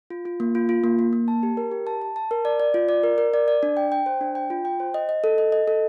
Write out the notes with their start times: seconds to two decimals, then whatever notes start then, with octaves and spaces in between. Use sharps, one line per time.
0.10 F4
0.25 F4
0.40 A#3
0.55 F4
0.69 F4
0.84 A#3
0.99 A#3
1.13 A#3
1.28 A5
1.43 G4
1.57 A#4
1.71 G4
1.87 A5
2.02 A5
2.16 A5
2.31 A#4
2.45 D5
2.60 D5
2.74 F4
2.89 D5
3.03 A#4
3.18 A#4
3.34 D5
3.48 D5
3.63 D4
3.77 G5
3.92 G5
4.06 C5
4.21 D4
4.35 G5
4.50 F4
4.65 G5
4.80 C5
4.94 D#5
5.09 D#5
5.24 A4
5.38 D#5
5.52 D#5
5.68 A4